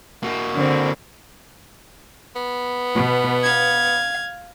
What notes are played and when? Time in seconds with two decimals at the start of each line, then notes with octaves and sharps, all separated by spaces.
0.23 A#3 F#4
0.55 D3 C4
2.36 B3
2.95 B2
3.44 F5 G#6